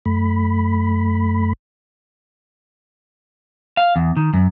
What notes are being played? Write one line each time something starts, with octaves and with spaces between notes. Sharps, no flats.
F#2 A3 B5
F5
E2
D#3
F#2